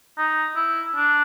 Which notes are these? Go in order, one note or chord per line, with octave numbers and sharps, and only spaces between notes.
D#4
E4
D4